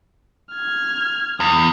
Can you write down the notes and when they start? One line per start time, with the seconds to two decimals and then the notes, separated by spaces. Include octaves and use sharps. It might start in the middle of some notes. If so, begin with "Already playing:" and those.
0.52 F6 G#6
1.40 E2 D#6